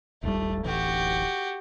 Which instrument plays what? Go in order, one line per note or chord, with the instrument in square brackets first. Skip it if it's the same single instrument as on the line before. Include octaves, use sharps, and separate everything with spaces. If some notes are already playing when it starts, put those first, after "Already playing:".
[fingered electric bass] D#1 G#1 G3 [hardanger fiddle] A3
[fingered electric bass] D1 A1 E3 [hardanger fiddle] F#4 G4